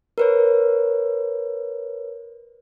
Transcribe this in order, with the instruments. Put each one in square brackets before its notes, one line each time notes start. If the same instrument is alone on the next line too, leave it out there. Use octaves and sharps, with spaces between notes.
[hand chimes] A#4 B4 C#5